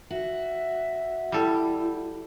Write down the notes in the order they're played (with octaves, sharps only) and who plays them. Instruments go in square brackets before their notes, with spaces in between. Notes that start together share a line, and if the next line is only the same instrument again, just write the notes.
[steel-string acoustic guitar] F#4 [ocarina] E5
[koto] G3 A4 [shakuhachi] E4